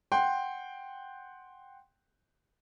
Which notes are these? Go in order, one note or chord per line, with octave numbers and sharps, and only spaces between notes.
F#5 G5 C6